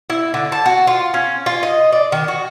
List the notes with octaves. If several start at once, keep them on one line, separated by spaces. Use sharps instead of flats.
E4
D3
A5
F#4
F4
C#4
F4
D#5
D5
D#3
F#4